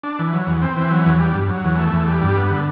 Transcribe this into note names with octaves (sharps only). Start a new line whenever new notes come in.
D4
E3
F#3
E2
C4
E3
F#3
E2
G3
G2
F#3
E2
A3
E2
G3
G2
B3
D3